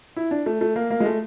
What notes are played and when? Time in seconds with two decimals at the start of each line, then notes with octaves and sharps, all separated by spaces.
0.16 E4
0.31 D4
0.46 A3
0.61 A3
0.76 A#3
0.90 A#3
1.00 G#3
1.06 A3